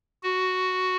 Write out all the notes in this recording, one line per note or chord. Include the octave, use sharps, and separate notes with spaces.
F#4